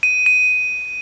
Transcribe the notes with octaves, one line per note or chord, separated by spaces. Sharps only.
D#7
D#7